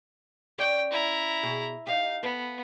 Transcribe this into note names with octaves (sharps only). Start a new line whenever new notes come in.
C#4 C#5 D5 G5
E4 A#5
B2 G#4
D#4 G4 F5
B3 A4 B4